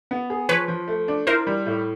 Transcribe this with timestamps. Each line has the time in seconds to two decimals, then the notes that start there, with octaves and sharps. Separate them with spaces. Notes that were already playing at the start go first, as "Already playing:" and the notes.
0.11 B3
0.30 G#4
0.49 F3 B4 C#5
0.68 F3
0.88 A3
1.08 D4
1.27 E4 A#4 C5
1.47 G3
1.66 A2